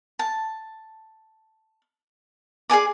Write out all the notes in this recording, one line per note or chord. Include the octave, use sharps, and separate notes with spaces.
A5
G#4 D5 G#5 D6